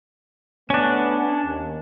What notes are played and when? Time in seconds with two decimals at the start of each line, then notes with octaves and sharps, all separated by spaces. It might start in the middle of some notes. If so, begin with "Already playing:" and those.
0.70 A3 B3 C#4 D4
1.46 D#2